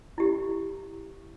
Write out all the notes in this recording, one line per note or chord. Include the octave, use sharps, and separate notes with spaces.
E4 G4